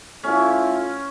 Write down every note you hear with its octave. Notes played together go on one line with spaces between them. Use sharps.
A3 C#4 E4 F4